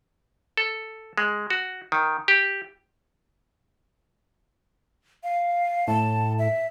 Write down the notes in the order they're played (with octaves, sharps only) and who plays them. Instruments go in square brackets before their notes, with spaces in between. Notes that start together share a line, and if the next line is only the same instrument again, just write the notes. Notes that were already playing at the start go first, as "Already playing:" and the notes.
[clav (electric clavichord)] A4
G#3
F#4
D#3
G4
[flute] F5
[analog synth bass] A2 [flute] A5
[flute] E5